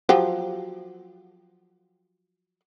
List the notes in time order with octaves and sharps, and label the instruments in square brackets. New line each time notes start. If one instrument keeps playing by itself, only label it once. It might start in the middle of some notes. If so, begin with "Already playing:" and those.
[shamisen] F3 F#3 G4